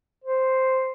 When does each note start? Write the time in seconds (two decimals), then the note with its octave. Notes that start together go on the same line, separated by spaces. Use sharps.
0.24 C5